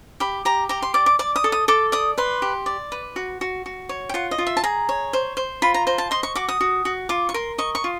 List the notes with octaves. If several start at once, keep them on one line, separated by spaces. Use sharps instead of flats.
G4 B5
G4 A#5
G4 A#5
C6
D5 D6
D6
D5 D6
D#6
A4
D#6
A4 D6
D5 D#6
B4 C6
G4
D5
B4
F#4
F#4
F#4
C#5
G5
F4 F#5
D#5
F4
E5
A5
G#4 A#5
C#5
C5
C5
F4 B5
A#5
C5 A#5
A5
D#5 C6
C#6
F#4 D6
D#6
F#4
F#4
F4 D6
C#6
A#4 C6
D#5 C#6
C#6
F4